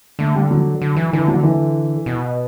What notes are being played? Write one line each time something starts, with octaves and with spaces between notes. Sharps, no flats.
D3 A3
G3
F#3
D3
E3
D3 E3
F#3
E3
B2